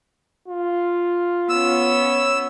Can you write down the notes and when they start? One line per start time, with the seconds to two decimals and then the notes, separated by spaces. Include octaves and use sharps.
0.48 F4
1.49 B3 C#4 E6